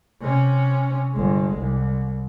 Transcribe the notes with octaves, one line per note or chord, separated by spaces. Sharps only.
C3 C#4
G1 G#3
C2